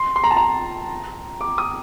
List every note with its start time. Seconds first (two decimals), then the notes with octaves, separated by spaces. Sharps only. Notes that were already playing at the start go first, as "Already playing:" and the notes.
Already playing: C6
0.16 C6
0.24 A#5
0.31 A5
0.37 A#5
1.41 D6
1.58 D#6